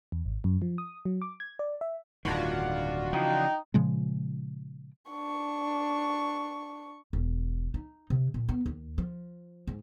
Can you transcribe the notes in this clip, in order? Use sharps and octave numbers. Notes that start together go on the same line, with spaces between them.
E2
G#1
F#2
F3
D#6
F#3
D6
G#6
D5
E5
D1 G2 D#3 D4 F4 F#4
C#3 E3 F3 D#4 G5
A#2 C#3 F3 G#3
D4 C#6
E1
D#4
C3
A#2
B3
D#2
F3
G#2